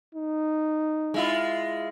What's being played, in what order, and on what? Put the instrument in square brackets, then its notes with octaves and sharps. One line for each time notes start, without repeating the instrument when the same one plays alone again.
[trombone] D#4
[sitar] G#3 E4 F4